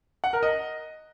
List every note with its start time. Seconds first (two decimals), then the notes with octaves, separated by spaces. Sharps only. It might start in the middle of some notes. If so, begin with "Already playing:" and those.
0.24 F#5
0.33 A#4
0.43 D#5